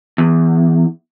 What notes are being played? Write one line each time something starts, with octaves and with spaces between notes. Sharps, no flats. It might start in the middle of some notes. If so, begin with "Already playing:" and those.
E2